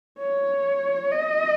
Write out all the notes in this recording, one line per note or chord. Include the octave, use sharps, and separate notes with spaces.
C#5
D#5